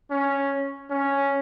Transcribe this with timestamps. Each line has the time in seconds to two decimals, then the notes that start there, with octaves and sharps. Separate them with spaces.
0.11 C#4
0.90 C#4